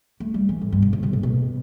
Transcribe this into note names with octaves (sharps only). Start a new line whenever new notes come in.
A3
G3
E3
A2
G2
B2
D3
B2
A2
B2